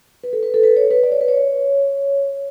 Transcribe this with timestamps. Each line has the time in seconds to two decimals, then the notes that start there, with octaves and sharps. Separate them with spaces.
0.24 B4
0.33 A4
0.43 B4
0.54 A4
0.63 B4
0.77 C#5
0.91 B4
1.03 D5
1.12 C#5
1.21 B4
1.28 C#5